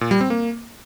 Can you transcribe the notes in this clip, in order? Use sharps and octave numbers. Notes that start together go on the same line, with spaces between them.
A#2
G3
C4
A#3